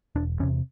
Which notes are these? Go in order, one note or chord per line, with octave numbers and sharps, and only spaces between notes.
E1 D4
E2 C3 C#4